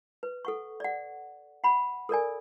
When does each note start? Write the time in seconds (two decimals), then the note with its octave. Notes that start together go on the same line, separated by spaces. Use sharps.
0.23 B4
0.45 A4 F#5 C#6
0.80 D5 F#5
1.64 F#5 B5
2.09 A4 A#4 D5 G#5